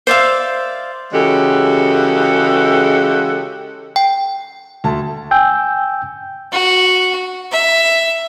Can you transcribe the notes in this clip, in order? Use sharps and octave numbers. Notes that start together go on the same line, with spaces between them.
C5 D5 E5 F5
C#3 E3 G#3 F#4 G4 A4
G5
D2 A5
G5 G#5 E6 G6
F#4
E5